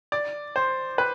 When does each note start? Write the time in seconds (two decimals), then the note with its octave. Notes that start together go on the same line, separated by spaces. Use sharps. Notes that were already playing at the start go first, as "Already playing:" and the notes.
0.12 D5
0.56 C5
0.98 B4